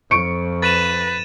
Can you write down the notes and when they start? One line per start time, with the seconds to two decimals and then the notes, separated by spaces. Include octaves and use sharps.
0.11 F2 F3 C#6 C#7 D7
0.62 B4 A6 D#7 E7